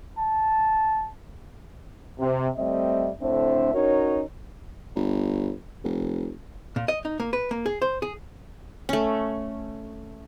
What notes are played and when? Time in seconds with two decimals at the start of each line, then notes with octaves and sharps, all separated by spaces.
0.19 A5
2.19 C3
2.57 G3 A3 C4 D#5 E5
3.21 A2 D3 C4 D4 C5 E5
3.74 C#4 D#4 F#4 A#4 C#5
4.96 G1
5.84 F1
6.76 A#2
6.88 D#5
7.05 D#4
7.20 A#3
7.33 B4
7.51 A#3
7.66 G#4
7.82 C5
8.02 G#4
8.89 A3 C#4